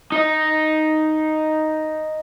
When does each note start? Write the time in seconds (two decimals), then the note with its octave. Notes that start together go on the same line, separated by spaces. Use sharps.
0.12 D#4 D#5